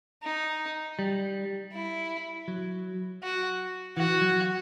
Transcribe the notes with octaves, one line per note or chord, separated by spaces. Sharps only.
D#4
G3
E4
F#3
F#4
E3 F#4
F#3